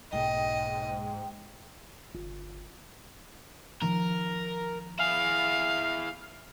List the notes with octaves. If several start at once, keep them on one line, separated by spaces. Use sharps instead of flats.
B1 G#2 A#3 D#5 G5
G1
D#3 F3 A#4
E4 G#4 F5